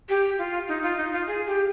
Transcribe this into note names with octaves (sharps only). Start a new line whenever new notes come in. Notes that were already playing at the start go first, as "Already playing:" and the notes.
G4
F4
D#4
F4
D#4
F4
G#4
G4